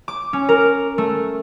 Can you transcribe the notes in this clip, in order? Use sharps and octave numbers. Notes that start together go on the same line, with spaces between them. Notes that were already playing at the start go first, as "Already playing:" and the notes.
D6
C#4
A#4
A3